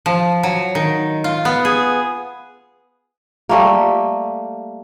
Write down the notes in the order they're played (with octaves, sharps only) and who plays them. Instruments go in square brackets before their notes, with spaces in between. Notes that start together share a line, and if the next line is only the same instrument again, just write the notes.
[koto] F3
F#3
D#3
F4
B3
G#4
[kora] G3 A3 A#3